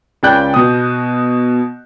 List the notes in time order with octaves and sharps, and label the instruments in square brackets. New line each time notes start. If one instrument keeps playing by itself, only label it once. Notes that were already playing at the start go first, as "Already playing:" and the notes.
[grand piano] C#2 C#3 D5 G5 F#6 G6
B2 D#6